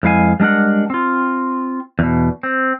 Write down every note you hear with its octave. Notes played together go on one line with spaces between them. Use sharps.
F2 G#3 E4 F5 G#5
G3 G#3 D4 A#4 F#5
C4 F4
E2 B2
C4